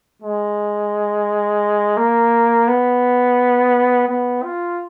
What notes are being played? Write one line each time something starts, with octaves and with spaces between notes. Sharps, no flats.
G#3
A#3
B3
B3
F4